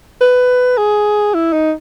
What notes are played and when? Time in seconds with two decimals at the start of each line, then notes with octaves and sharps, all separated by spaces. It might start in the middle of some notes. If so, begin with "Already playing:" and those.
0.21 B4
0.77 G#4
1.34 E4
1.53 D#4